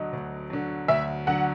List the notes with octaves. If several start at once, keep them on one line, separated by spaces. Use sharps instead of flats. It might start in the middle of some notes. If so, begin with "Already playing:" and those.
Already playing: D2 D3 F#3 D#5
D2
D3 F#3
D2 E5
D3 F#3 F#5